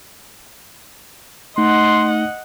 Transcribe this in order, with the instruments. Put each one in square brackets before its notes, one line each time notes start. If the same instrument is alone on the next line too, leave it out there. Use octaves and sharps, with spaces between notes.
[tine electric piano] A3 D#4 [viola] D#5 F#5 [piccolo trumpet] C6